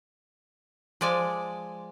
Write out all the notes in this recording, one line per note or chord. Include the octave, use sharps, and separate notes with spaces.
F3 G#3 D5 G#5